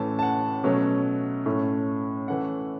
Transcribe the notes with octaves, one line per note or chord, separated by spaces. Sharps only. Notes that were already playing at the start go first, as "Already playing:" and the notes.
Already playing: A2 E3 A3 C#4 A5
A5
F#5
B2 F#3 A3 C#4
A2 A3 C#4
E3 A3 C#4 F#5